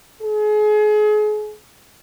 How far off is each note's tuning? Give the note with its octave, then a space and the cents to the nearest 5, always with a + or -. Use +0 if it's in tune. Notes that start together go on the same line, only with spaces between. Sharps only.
G#4 +35